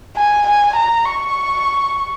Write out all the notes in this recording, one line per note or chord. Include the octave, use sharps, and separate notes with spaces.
G#5
G#5
A#5
C#6